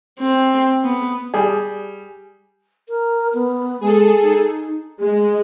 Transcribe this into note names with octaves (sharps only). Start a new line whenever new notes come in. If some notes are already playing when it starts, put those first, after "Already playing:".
C4
B3
G3 G#4
A#4
B3
G#3 G#4 A4
D#4
G#3